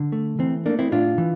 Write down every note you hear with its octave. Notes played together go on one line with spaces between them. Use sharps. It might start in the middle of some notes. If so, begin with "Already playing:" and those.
Already playing: D3
A3
E3 C4
A3 A#3 D4
C4 E4
A2 D4 F4
E3